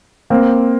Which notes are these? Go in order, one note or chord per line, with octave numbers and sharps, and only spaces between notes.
A#3 C4